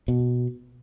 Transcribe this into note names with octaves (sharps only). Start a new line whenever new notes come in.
B2